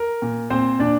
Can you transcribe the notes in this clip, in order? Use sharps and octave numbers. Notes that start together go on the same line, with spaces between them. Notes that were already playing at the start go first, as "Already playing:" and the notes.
Already playing: A#4
A#2
A#2 C4 C5
A#2 D4 D5